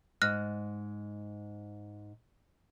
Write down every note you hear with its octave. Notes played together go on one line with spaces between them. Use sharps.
G#2 F6 F#6 A#6